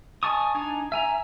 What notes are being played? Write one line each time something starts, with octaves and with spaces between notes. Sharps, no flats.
D#5 G#5 A5 C#6 D#6
D4 D#4 G#5
E5 G#5 A#5